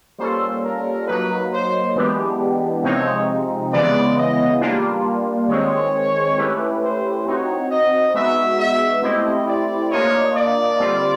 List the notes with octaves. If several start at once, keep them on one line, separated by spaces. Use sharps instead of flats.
G3 A#3 C#4 F4 A4 C5
A#4
F#3 A#3 D#4 B4
C5
E3 G#3 B3 D4 G4
C3 F3 G#3 C4 D#4 C#5
C#3 E3 G#3 B3 D5
D#5
G3 A#3 D4 F4
D#3 G#3 C4 C#5
A3 C#4 E4 G4 B4
C5
C4 D#4 F#4 C#5
D#5
G#3 B3 D#4 F#4 E5
E5
A3 C4 E4 G4 C5 D#5
D5
A#3 D4 F4 A#4 C#5 D#5
D5
D3 G3 C4 F4